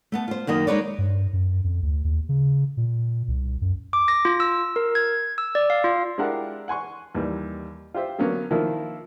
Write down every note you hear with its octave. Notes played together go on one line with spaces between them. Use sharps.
A3 B3 A5
F4 C5
F#2 D#3 A#3 D#5
G#3 D#4 A#4 B4 C#5 D5
G2
F#2
F2
D2
D#2
C#3
A#2
C2
F#2
D6
A#6
F4
E6
A#4
G#6
E6
D5
F5
F4
G#3 D4 E4 G4 A#4 F#5
F#5 G#5 C6 C#6
D#2 E3 G3
F4 G4 C5 E5
D3 F#3 A#3 B3 C#4
D#3 F3 A#3 E4 F4